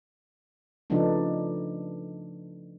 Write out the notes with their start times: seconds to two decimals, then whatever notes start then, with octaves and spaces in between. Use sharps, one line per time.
0.90 C#3 F3 A3 B3 D4 D#4